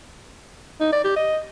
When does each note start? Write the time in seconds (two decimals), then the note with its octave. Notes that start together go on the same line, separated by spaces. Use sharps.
0.81 D#4
0.93 D5
1.04 G4
1.16 D#5